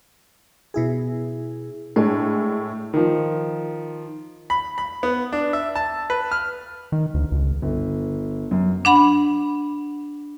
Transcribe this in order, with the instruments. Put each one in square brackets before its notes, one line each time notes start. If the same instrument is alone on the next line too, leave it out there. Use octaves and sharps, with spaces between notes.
[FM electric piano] B2 E4 G#4
[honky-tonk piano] A2 G#3 [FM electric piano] D4
[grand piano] D#3 F3
[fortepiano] B5
B5
B3
D4
E5
A5
B4
F6
[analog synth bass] D#3
D2
C#2
[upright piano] G1
F#2
[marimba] D4 F#5 B5